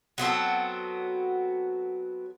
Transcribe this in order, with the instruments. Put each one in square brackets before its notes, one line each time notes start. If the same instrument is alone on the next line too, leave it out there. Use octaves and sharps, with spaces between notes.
[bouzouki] F#3 B3 C4 A4